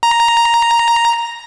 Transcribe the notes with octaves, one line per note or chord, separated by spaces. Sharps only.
A#5